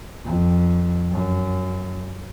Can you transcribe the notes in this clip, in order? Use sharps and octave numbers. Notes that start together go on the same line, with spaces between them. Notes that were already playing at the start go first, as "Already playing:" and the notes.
F2
F#2